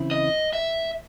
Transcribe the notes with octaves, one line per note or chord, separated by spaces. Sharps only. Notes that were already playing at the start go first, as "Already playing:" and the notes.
Already playing: C#3 E3 C4 E4
D#5
E5